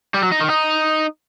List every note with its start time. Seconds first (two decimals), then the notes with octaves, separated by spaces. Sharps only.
0.14 G3
0.23 F#3
0.32 D#4
0.41 D#3
0.49 D#4